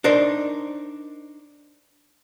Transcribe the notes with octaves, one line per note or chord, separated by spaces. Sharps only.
D4 D#4 A#4 C5